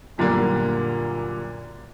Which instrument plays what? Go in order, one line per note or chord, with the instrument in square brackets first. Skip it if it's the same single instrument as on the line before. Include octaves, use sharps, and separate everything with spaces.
[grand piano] F#2 A#2 D3 G3 A#3